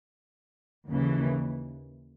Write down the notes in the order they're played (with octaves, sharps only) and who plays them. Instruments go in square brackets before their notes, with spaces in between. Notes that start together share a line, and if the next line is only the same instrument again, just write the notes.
[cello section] D#2 C#3 E3